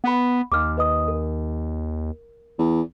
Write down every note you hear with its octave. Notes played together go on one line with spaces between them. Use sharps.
B3 F#5 B5
D#2 D6 F6
B4 D#5 D#6
A#4
E2